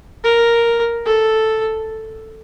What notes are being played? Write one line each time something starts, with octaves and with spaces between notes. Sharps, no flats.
A#4
A4